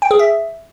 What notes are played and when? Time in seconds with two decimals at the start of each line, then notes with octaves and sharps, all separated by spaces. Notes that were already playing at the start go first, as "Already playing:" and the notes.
0.02 G5
0.11 G#4
0.19 E5